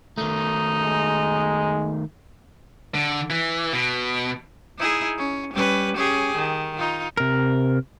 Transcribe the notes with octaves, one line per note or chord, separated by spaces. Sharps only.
D#3 A3 D#4
G#3
D3
E3
B2
D#4 E4 G#4
C#4
G3 C#4 B4
C#4 G4 G#4
D#3
D#4 F4
C3 A#4